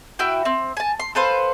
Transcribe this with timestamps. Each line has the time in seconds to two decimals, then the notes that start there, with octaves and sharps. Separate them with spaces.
0.19 E4 F#4 G5
0.45 C4
0.77 G#5 A5
1.00 C6
1.15 A4 B4 C5 F5